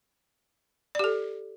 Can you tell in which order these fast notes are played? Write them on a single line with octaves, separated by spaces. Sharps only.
D5 G4 A4